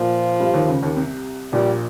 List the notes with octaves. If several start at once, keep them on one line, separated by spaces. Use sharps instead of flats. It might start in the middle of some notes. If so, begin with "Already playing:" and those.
Already playing: A#2 F3 A#3
G2 G3
D#2 D#3
C#2 C#3
D#2 D#3
C2 C3
A#1 A#2 G3